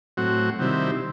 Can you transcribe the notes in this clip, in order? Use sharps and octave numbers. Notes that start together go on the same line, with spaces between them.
A2 F#3 C4 F#4
C3 D#3 G3 C4 E4